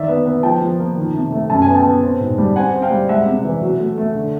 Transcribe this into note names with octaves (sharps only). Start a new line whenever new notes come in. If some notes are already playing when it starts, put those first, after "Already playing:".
Already playing: D#3 D5 E5
B3
B3
F3 G5 A5
F3
A#3
D#3
C3
A3
F#2 A5
G#5
B3
G5 A5
B3
C4
G#2
G3
C4 F#5 G#5
C4
F5 G5
G3
G#3 E5 F#5
C3
E3
F#3
A3
A3
D3